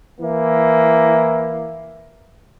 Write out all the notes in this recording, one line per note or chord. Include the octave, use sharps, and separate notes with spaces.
E3 A#3 E4